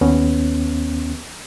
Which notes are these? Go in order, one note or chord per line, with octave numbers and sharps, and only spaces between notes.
D#2 B3 C#4